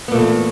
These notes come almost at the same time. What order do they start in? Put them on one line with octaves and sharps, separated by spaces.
B3 A#2 A3 E3